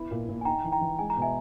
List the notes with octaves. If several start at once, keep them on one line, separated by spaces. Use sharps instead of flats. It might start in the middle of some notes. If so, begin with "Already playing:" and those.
Already playing: B3 E4
A#2
A#2
G#5
D#4 G5 A#5
E3
G5 A#5
E3
G#3 G#5
A#5
B2
E5 G#5